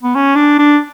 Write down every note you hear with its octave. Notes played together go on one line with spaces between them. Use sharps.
B3
C#4
D4
D4